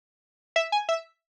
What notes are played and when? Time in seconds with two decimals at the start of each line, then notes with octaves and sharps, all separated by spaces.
0.56 E5
0.72 G#5
0.89 E5